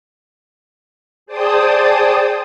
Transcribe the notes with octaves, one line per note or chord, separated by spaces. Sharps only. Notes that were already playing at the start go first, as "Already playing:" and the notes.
G#4 C5 D5 G5 A5 D#6